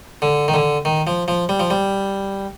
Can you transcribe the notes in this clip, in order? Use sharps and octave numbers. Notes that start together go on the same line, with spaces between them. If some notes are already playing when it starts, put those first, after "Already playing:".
D3
D#3
D3
D#3
F3
F3
G3
F3
G3